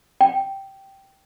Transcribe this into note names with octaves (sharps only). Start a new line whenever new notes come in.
G5